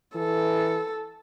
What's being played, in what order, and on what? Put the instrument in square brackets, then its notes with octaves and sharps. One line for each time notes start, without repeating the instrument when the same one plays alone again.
[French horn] E3 [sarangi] A4